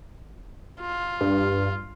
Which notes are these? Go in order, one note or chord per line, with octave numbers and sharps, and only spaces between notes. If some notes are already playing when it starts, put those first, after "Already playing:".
F4
G2